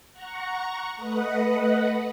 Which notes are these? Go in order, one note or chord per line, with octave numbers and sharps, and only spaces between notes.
F#5 A#5 C#6
A3 B4 D#5 F#5